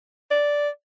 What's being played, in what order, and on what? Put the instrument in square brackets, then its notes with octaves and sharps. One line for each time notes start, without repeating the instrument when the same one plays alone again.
[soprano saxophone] D5